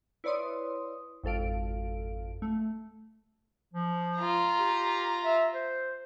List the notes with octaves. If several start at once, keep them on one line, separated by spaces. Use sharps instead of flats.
E4 B4 C#5 D5 C6 D#6
G#1 F2 A4 F5 D7
A3
F3
F4 A#5
G4
E5
C5